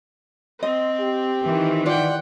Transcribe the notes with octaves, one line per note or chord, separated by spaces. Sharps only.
C4 D#5
G4
D#3 E3
F4 D5 F#5 G5